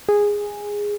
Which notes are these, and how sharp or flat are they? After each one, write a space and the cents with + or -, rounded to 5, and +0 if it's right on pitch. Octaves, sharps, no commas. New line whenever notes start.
G#4 -10